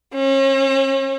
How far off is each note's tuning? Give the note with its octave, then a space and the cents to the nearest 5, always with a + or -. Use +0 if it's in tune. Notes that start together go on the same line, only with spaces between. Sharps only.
C#4 -40